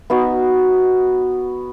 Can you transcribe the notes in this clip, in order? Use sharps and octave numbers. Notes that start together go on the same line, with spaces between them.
B3 D#4 F#4